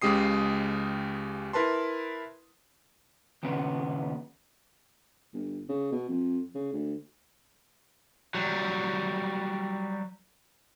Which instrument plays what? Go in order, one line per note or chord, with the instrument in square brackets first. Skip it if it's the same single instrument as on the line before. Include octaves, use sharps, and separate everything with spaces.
[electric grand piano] C#2 C#3 G#3 G4 D#6 C7
E4 A#4 B4 A5 C6
[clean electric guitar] D#2 A#2 C#3 B3
[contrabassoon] G1
C#3
B2
F2
C#3
D2
[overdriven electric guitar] F#3 G3